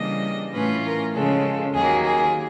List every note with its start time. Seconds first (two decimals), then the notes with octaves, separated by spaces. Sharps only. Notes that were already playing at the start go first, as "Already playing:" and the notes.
Already playing: C#3 E3 G3 A#3 D4 D#5
0.53 A2 E3 A3 C#4 F4 B4
0.83 A#4
1.13 C#3 F3 G#3 C#4 A4
1.74 D#2 D#3 F#3 A#3 G#4
2.05 G#4